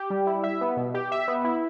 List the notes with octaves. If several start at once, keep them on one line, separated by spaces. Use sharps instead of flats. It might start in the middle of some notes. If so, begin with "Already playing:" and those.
Already playing: G4
G3
E4
E5
B3
B2
G4
E5
B3
E4